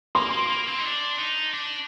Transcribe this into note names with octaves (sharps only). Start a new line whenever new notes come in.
A#3 C6
A#3
A#3
C4
D#4
D4
D#4
D4